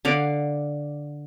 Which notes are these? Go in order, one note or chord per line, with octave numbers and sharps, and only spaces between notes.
D3 F5 F#5 D6